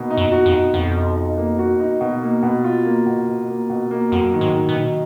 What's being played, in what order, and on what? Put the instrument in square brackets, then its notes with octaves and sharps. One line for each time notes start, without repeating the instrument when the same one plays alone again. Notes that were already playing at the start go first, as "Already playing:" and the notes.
Already playing: [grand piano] B2 A#3 D#4
D#4
[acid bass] F#2
[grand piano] F#4
[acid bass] F2
[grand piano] D#4
[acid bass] F2 [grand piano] B2
[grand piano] D#4
D#4
A#3
F#4
D#4
B2
A#3
B2
F4
A#3
B2
B2
A#3
B2
A#3
[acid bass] F2 [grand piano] F#3
[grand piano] D#3
[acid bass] G#2
[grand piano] D#3
[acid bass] B2
[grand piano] D#3